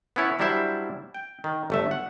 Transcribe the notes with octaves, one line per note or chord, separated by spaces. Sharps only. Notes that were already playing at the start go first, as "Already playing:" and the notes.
B3 C#4 E4 C#5
F#3 G3 D4 E4 C5 E5
G5
D#3
G1 A3 E5
F#5